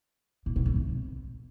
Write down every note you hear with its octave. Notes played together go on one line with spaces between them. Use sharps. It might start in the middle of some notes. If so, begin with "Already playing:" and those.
A#2
B2
G#2
C3